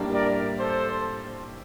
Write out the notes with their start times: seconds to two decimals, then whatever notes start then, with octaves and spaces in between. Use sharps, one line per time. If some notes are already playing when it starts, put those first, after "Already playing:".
Already playing: A2 G3 A#3 D4
0.13 A#4 D5
0.59 A4 C5